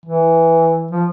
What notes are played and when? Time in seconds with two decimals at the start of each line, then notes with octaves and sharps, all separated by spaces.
0.06 E3
0.91 F3